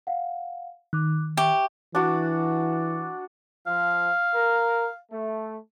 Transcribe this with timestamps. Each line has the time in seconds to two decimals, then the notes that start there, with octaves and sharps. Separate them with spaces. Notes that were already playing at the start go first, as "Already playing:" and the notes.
0.07 F5 F#5
0.93 D#3 D6 F#6
1.37 G4 E5 C#6
1.95 E3 D4 F#4
3.67 F3 F5
4.34 A#4
5.11 A3